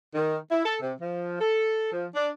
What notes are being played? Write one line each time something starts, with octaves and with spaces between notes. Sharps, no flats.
D#3
E4
A4
C3
F3
A4
F3
D4